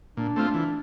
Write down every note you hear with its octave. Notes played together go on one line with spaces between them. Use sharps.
A#2 D4
A3 C4 F4
E3